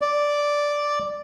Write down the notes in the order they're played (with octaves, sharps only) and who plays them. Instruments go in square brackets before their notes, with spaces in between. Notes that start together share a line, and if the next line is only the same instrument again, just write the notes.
[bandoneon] D5